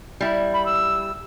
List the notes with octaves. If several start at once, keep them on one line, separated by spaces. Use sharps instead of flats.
G3 E4
B5
E6